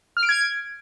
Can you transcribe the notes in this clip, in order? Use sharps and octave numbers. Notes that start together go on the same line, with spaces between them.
F6
D7
G#6